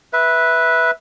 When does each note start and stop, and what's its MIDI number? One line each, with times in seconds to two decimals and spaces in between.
0.13 0.91 71
0.13 0.91 76